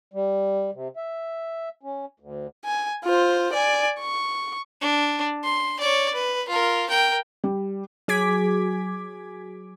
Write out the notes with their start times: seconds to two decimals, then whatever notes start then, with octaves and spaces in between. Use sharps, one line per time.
0.14 G3
0.74 C3
0.96 E5
1.83 C#4
2.20 D2
2.65 G#5
3.04 F4 C5
3.53 D5 G#5
4.00 C#6
4.81 D4
5.44 C6
5.79 C#5 D5
6.14 B4
6.48 F4 A#4
6.89 A#4 G5
7.44 G3
8.08 F#3 G#4 D6 G#6 B6